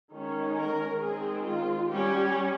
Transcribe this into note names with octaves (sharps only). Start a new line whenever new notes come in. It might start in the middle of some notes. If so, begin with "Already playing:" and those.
D#3 G#3 C#4
A#4
D#3 G#3 C4 G#4
F4
G3 C#4 G4